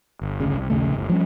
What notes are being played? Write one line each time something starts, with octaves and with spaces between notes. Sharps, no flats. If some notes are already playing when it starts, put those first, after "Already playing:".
G1
G1 D2 C#3
C2
A#1 D#2 C#3 A3
G1
F3 G3 C#4